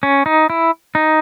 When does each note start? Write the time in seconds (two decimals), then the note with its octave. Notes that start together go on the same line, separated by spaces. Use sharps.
0.03 C#4
0.26 D#4
0.50 E4
0.95 D#4